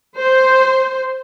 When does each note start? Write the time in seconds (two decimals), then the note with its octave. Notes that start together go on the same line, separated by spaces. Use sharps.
0.16 C5